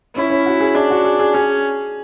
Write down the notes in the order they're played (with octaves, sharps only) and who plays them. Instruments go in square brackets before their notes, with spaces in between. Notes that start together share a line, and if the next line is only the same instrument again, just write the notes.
[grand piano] C#4 [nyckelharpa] E4
[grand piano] C#4
F#4
G#4
[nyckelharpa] D4 [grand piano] G#4
[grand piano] F#4
G#4
G#4
[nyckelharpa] C#4 [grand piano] G#4